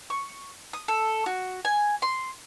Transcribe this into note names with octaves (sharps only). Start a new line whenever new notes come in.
C#6
D#6
A4
F#4
G#5
C6